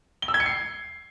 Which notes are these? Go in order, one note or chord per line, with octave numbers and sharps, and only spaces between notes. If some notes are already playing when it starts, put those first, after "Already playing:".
G7
E6
G#6
C#7
C7